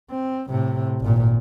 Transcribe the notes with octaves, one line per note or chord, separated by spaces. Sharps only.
C4
A2 C3
G#1 A#2